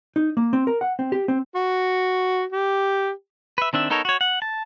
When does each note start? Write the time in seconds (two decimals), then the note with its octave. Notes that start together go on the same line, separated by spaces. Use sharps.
0.16 D#4
0.37 A#3
0.53 C4
0.67 A#4
0.81 F#5
0.99 C4
1.12 G4
1.28 C4
1.56 F#4
2.52 G4
3.58 B4 E5
3.73 D#3 C4 D4 E5
3.90 B3 D#4 A4 A#4 C#5
4.05 F#4 C#5
4.21 F#5
4.42 A5